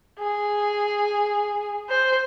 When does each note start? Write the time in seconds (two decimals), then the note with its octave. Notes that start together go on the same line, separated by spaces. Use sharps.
0.19 G#4
1.89 C5